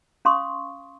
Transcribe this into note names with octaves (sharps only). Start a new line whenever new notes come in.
C#4 F5 C6 C#6 D#6